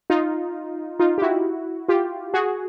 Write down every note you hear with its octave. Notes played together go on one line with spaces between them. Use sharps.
D#4 F4
D#4 F4
G4
E4 F#4
F4 G4
F#4 G#4